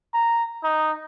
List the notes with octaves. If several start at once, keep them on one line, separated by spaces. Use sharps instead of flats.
A#5
D#4